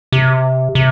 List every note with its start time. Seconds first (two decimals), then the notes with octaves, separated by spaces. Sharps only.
0.12 C3
0.75 C3